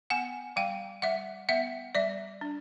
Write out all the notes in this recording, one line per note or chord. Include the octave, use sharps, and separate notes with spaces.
B3 F#5 G#5
G3 F5 G5
G3 E5 F#5
B3 E5 F#5
G3 D5 E5
D4